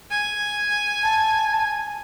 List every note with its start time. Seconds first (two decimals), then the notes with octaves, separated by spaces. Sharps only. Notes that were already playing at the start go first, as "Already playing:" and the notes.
0.11 G#5
1.03 A5